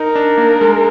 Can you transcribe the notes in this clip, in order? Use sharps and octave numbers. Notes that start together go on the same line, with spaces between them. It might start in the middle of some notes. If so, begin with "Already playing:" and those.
Already playing: D#4 A#4
D4
A#3
G#3